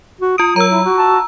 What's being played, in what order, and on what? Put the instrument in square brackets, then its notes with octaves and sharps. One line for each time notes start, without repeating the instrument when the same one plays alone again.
[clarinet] F#4
[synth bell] F4 D7 [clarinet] D#6
[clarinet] F#3 [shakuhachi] A#4 [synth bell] A#5 E6
[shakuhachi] E4
F#4
[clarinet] A5